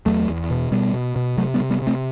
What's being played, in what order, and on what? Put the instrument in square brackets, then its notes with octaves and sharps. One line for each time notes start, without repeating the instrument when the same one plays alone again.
[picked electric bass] E2 F#3 A3
E2
B2
B2 G3 B3
B2
B2
C3 F#3 A3
G3 B3
C3
G3 B3
C3
A3 C4